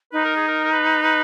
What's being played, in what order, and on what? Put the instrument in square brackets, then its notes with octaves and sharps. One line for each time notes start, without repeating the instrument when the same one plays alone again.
[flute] D#4 [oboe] B4
[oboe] A#4
G#4
A#4
A#4
B4
B4